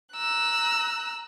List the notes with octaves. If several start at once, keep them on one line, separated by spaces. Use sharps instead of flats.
A#5 E6 F#6